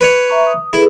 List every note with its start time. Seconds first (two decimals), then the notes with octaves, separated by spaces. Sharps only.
0.01 B4 C#5
0.30 E5 A#5 C#6
0.47 D#6
0.73 E4 G#4 A4 B4